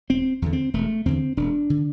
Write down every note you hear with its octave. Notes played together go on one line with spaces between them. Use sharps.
E1 C4
E2 D3
C4
E1 A3
E2 D3 C4
E1 D4
D3